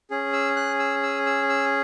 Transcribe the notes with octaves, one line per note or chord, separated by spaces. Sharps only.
C#4 G#4
E6
F#6
E6
E6
E6
E6